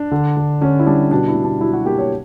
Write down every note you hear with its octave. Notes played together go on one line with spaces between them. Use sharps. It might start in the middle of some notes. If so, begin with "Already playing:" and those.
Already playing: D4
D3
D3
D3 C#4
E4
G3 D4
B2 D4
E4
B2
D4
F#3 E4
F#4
A#3 G4
C#5